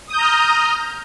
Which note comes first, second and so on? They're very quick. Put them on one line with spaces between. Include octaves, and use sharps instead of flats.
D#6 G6 A#5 F6